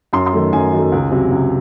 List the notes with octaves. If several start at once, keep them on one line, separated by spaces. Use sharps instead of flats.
F#2 C6
C6
D#3 F#3 A3
F#2 G#5
D#3 F#3 A3
C#2
C3 F#3
C#2